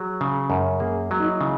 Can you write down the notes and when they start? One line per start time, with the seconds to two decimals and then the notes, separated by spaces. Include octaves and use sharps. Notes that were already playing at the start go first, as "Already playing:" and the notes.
Already playing: F#3 G#4
0.21 C#3
0.50 F#2
0.80 A#3 G#4
1.11 F#3
1.19 D#4
1.25 E4
1.41 C#3